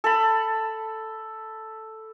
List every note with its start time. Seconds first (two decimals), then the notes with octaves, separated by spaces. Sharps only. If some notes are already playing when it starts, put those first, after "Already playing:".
0.04 A4 B5